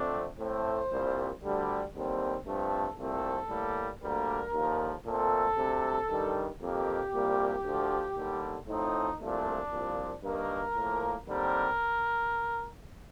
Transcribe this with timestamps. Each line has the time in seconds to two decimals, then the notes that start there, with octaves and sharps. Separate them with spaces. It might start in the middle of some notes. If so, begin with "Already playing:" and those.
Already playing: F2 D3 A3 C4 D4
0.39 A2 A3 C4 C5
0.91 C2 A#2 G3
1.43 D2 D3 G3
1.95 D#2 D3 G3 C4
2.46 G2 F3 A3 C4 A4
2.98 C2 A#2 A3 C4 A4
3.49 A2 G3 A#3
4.01 D2 D3 G3 A#3 A#4
4.53 D#2 D3 F3 A#3
5.05 A#2 A3 C4 A4
5.57 D2 C3 G3
6.09 G2 D#3 G3
6.61 F2 D#3 A#3 G4
7.13 C2 A#2 G3 A#3
7.64 D2 D3 F3
8.17 D#2 D3 G3
8.68 A2 F3 C4 D#4
9.20 C2 A#2 F3 A3 D4
9.72 C2 A#2 F3
10.23 G2 D#3 A#3 A#4
10.76 A2 F3 A#3
11.27 D#2 D3 G3 C4 A#4